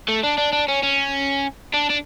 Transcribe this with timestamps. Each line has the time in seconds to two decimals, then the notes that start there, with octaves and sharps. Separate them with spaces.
0.08 A3
0.23 D4
0.38 D4
0.53 D4
0.68 C#4
0.83 C#4
1.74 D4
1.90 D4